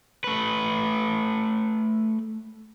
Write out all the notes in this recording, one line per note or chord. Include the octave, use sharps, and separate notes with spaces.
A3 B4